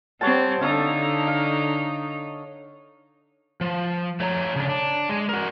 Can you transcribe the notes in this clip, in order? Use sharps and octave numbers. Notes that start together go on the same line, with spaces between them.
G3 C4 C#5 F#5 A5
D3 D#4 A4 C#5 F5
F5
F3
A3 C#5 A#5
C#3 D4
D4
G#3
F#4 A#4